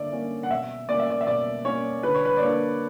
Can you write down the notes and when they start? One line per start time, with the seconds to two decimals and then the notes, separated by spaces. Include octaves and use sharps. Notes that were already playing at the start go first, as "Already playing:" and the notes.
Already playing: D3 A#3 D5 E5
0.12 A#3 C#4
0.43 F#5
0.50 B2 E5
0.89 A#3 C#4 D5
1.00 E5
1.10 D5
1.21 E5
1.27 B2 D5
1.65 A#3 C#4 C#5
2.03 D3 B4
2.14 C#5
2.25 B4
2.37 D5
2.41 A#3 D4 C#5